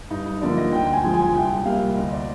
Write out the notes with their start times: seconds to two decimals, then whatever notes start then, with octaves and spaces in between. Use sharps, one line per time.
0.10 G2 D#4
0.26 D#4
0.41 D3 F3 A#3 D5
0.57 D#5
0.72 D2 G5
0.93 G#5
1.04 D3 F3 G#3
1.14 G#5
1.34 C2 G5
1.65 C3 G3 A#3 F5
1.96 D2 D#5
2.12 D5